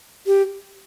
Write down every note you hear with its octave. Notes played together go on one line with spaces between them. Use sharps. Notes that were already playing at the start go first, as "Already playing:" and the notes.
G4